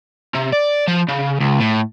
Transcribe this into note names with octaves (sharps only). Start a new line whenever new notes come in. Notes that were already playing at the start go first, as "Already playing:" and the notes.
C3
D5
F3
C#3
C#2
A2